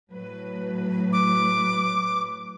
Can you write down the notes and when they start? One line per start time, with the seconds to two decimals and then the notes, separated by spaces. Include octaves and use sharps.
0.11 A2 F#3 B4
1.13 D6